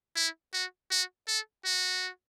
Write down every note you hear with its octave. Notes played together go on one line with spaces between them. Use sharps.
E4
F#4
F#4
A4
F#4